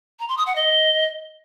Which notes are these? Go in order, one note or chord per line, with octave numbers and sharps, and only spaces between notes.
A#5
C6
D#6
F#5
D#5